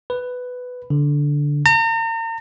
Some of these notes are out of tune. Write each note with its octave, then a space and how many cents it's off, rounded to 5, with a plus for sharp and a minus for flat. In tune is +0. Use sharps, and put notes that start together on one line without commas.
B4 +10
D3 -10
A#5 -40